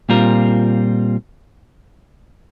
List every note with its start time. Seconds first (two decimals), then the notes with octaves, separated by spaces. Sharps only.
0.09 A#2 G3 C4 F4 A#4